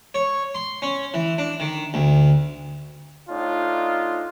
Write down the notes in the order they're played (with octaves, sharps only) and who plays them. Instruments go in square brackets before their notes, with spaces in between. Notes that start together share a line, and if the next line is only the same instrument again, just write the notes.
[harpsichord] C#5
C6
C#4
E3
D4
D#3
D2
[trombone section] A2 D4 D#4 [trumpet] F4